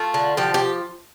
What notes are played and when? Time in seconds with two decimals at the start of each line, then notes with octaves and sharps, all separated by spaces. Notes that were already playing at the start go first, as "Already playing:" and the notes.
Already playing: A3 F4
0.14 D3
0.37 F3 G4
0.54 G4